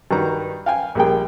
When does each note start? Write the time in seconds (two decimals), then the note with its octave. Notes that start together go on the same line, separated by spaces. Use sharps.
0.11 G2 D#3 F#4 B4 A#5
0.66 F5 G5 G#5
0.95 A#1 G3 A#3 G#4 G5